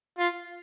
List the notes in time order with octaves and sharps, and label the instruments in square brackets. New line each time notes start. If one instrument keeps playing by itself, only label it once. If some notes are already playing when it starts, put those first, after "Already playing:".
[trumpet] F4